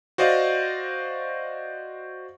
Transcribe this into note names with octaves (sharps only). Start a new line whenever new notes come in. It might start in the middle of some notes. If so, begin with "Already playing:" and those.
F#4 C5 D5 D#5 F5